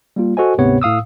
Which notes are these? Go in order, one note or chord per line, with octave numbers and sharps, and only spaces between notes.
G3 A#3 F4
F#4 A4 C5 D#5 G#5
D2 G#2 C3 B3 C#5
A2 F5 D#6 E6